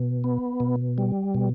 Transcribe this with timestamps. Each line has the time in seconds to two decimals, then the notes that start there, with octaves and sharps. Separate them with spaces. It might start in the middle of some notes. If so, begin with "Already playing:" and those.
Already playing: B2
0.24 B3
0.60 B2
0.98 G3
1.35 B2